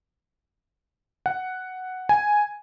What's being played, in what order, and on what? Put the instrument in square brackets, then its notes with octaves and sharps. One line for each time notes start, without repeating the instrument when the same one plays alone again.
[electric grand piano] F#5
G#5